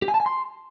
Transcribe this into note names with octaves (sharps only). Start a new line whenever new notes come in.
G4
G#5
A5
G#5
C6